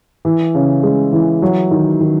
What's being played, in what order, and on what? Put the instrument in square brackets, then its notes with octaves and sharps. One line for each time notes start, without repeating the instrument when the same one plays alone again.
[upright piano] E3
C#3
G#3
E3
F#3
D#3
D#3